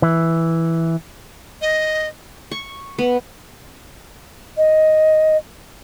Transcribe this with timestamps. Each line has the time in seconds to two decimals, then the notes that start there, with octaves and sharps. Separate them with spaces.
0.02 E3
1.61 D#5
2.51 C#6
2.98 B3
4.57 D#5